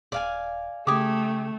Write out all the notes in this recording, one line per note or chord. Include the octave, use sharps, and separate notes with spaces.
D#1 D5 F5 G#5
C#3 A3 G4 G#5 D6 D#6